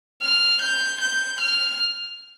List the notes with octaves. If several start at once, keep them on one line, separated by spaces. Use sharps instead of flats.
F6
G6
G6
F6